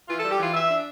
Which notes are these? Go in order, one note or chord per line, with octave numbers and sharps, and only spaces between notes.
E3 F4
G3 A4
G4
E3 F4
E3 E5
D4